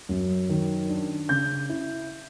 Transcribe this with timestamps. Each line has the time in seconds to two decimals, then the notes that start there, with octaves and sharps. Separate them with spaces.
0.09 F#2
0.49 D#3
0.89 D4
1.29 C#3 G6
1.69 E4